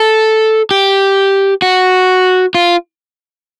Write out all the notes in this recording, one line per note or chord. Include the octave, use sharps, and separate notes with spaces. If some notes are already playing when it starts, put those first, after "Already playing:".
Already playing: A4
G4
F#4
F4